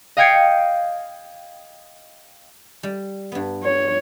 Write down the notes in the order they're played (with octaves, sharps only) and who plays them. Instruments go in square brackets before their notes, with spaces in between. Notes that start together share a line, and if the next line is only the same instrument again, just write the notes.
[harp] D#5 F5 G5 G#6 C7 C#7
[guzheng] G3
G2 B3
[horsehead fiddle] C#5